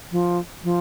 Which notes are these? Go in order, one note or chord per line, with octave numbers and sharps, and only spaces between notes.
F3
F3